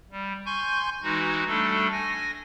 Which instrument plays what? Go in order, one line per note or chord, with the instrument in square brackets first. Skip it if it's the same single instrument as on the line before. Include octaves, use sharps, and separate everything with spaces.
[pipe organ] G3
G#5 C6 C#6 G6
E3 G#3 D#4 F#4
G3 A3 D4 A4
G#5 A#6